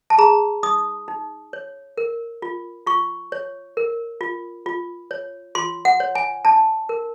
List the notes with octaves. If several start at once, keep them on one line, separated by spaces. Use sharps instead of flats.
A5
G#4 A#5
D#4 D#6
D#4
C#5
A#4
F4
F4 C#6
C#5
A#4
F4
F4
C#5
F4 C6
F#5
C#5
G#5
D4 A5
A#4